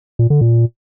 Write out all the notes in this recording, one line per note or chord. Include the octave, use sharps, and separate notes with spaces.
A#2
D3
A#2